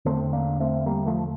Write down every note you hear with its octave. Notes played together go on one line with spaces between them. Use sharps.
E2 D3 A3 C4
A#3 D4
A3 C4
G3 A#3
F3 A3